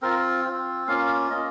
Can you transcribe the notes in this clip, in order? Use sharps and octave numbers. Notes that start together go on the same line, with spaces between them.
C4 F4 A#4
C4 F4
A#3 C#4 F4 F5
A#3 C#4 F4 D#5